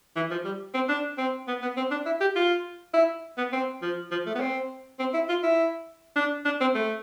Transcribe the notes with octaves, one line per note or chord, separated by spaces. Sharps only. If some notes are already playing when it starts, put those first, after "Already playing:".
E3
F3
G3
C4
D4
C4
B3
B3
C4
D4
E4
G4
F4
E4
B3
C4
F3
F3
A3
B3
C4
C4
E4
F4
E4
D4
D4
C4
A3